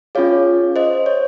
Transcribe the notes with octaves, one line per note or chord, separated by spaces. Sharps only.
C#4 F4 G#4 C#5 F5
C5 D#5
C#5